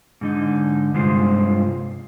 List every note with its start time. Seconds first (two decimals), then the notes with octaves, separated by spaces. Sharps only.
0.21 G#2 D3 D#4
0.94 G2 C3 G#3 F4 C5